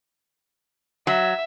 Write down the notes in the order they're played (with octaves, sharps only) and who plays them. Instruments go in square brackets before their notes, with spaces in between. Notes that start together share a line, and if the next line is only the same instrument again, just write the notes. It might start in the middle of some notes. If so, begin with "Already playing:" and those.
[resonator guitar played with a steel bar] F#3 [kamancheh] E5